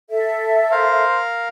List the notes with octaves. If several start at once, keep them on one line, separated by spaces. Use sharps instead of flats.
A4 E5
A#4 C5 F5